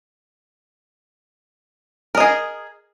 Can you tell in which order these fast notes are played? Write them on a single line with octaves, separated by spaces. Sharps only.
A#4 D#5 G#4